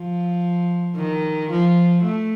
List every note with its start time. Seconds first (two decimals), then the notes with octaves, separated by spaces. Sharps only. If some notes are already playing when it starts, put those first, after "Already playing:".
Already playing: F3
0.96 D#3
1.50 F3
2.03 A3